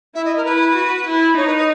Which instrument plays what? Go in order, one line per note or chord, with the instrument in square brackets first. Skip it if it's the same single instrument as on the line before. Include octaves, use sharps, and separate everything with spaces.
[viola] E4 [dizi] E5
[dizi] D#5
A#4
[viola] E4 [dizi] B4
[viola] F#4
E4
[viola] D#4 [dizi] C#5
[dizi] B4
D#5